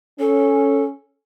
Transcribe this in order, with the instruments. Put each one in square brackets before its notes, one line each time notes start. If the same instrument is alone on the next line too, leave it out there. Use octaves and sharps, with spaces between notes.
[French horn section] C#4 [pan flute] A4